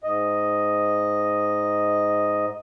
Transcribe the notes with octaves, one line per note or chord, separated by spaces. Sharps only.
G#2 D#5